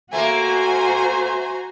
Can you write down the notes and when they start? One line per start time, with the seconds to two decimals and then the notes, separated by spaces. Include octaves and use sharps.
0.13 A3 A#3 F#4 C5 G#5 A#5